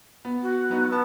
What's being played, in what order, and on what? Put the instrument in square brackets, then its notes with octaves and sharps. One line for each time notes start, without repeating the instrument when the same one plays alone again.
[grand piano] B3
[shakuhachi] F#4
[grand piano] F#3 B3 D#4
[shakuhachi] B3 [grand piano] A5 E6